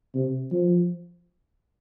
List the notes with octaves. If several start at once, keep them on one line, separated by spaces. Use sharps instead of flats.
C3
F3